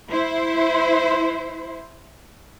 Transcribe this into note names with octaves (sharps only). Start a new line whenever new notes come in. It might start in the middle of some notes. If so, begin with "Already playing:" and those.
E4 C5